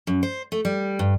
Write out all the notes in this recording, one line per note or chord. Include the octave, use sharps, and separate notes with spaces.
F#2
C5
A3
G3
G2